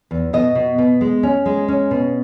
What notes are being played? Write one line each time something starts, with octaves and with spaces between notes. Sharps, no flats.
E2
B2 D#5
B2
B2
G#3
C#4
G#3
C#4
B2